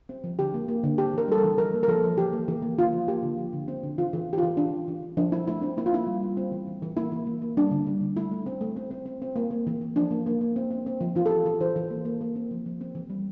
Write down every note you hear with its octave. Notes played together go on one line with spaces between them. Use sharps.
C4
F3
D3 G4
A#3
A#3
D3
C4 G4
E3 A#4
G3 A4
A#4
E3
F3 A#4
A#3
A#4
F3 A4
F3
E3 G4
A#3
E3
A#3
D3 F4
F3
A#3 G4
D3
F3
D3
C4
D3
E3 F4
E3
C4
G4
F4
E3
E3 D4
E3
E3
E3
F3 D4
C4 E4
A3 E4
C4 D4
A#3 E4
F4
A#3 E4
G3
G3
C4
E3
E3
E3
A#3 E4
E3
A#3
A#3
G3 D4
D3
G3
D3
A3 E4
A3
C4
A3
C4
C4
C4
C4
A#3
A#3
E3
E3
F3 D4
A#3
A#3
A#3
C4
C4
C4
F3
E3 F4
A4
C4 G4
E3 A4
E3 C5
E3
A#3
A#3
A#3
C4
F3
F3
C4
E3
G3